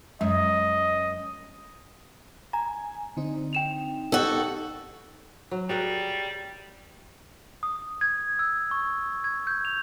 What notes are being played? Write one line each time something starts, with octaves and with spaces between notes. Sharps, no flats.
F#2 G#3 D#5
G#5 A#5
D3 C4 D#4
G5 E7 F7
D#4 F#4 G4 A4
F#3
G3 F#4 G#4 A#4
D#6
G#6
E6
C#6
G#6
G6
F7